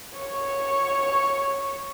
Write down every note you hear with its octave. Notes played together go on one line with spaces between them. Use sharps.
C#5 C#6